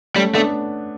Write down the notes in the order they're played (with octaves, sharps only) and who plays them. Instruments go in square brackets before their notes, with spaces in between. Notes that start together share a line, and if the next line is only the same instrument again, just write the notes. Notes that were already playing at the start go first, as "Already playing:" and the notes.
[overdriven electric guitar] G3 [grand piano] A3 C#4
[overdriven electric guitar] A3 [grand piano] B3 D4